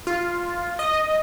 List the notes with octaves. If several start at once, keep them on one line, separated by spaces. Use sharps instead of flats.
F4
D#5